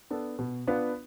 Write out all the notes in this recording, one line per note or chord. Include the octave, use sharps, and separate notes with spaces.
B3 D4 A4
B2
B3 D4 F4 B4